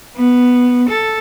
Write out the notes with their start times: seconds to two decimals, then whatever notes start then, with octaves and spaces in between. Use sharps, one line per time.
0.16 B3
0.89 A4